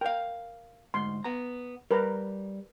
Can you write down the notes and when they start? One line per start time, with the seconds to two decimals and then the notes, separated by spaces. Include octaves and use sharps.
0.01 A#4 F5 G5
0.94 D2 G#2 C6
1.24 B3 A#5
1.91 G3 A#4 B4 A#5